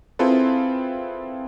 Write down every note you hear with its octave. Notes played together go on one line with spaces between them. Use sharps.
C4 E4 F4 G#4 A4 B4